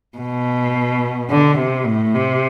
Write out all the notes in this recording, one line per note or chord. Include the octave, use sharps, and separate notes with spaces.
B2
D3
C3
A2
C3